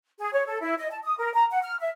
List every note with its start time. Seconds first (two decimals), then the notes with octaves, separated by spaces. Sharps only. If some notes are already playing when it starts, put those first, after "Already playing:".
0.19 G#4
0.33 C#5
0.46 A4
0.61 E4
0.77 D#5
0.90 A5
1.04 D#6
1.18 A#4
1.33 A#5
1.51 F#5
1.63 F6
1.80 E5